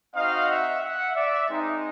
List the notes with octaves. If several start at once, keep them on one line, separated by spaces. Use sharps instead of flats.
C4 D#4 F#4 D#5 F5
E5 F#5
E5 F#5
D5 E5
G#3 C4 D#4